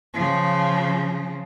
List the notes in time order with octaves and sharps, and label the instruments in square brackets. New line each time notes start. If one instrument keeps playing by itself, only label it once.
[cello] C#3 F3